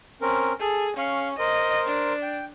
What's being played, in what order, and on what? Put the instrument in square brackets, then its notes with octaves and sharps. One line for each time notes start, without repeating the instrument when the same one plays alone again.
[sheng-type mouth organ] C4 C#4 A#4
[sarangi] G#4 [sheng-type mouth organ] A4
[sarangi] C#4 [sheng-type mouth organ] F5 C#6
[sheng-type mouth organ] A#4 C5 [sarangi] D#5
[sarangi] D4
[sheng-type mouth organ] G5